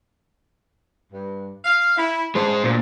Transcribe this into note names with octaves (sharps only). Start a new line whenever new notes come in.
G2
F5
E4
C#3 G#3 D4 G#4 C5
D2 A#2